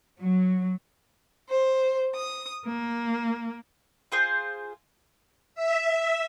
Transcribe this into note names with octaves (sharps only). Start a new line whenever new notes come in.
F#3
C5
D#6
A#3
F4 G#4 C5
E5